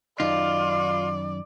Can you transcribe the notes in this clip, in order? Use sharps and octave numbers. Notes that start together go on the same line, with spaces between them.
F#2 D#3 D#4 F4 D5